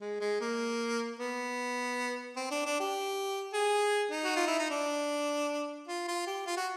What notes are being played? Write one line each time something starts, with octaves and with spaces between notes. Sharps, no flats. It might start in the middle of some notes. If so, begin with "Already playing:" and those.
G#3
G#3
A#3
B3
C4
D4
D4
G4
G#4
D#4
F#4
F4
E4
D#4
D4
F4
F4
G4
F4
F#4